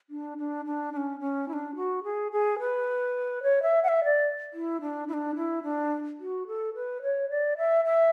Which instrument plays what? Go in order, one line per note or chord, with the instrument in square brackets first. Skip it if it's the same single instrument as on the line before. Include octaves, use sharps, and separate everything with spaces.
[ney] D4
D4
D4
D4
C#4
C#4
E4
D4
F#4
G#4
G#4
B4
C#5
E5
F#5
E5
D5
E4
D4
E4
D4
E4
D4
F#4
A4
B4
C#5
D5
E5
E5